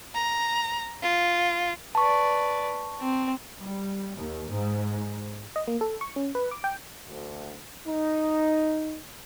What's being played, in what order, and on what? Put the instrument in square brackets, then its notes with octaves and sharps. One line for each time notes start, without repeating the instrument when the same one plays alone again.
[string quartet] A#5
F4
[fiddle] B4 D5 [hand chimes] A5 C#6
[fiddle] C4
[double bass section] G3
D#2
G#2
[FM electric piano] D#5
A#3
A4
C#6
C#4
B4
D6
G5
[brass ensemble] D2
D#4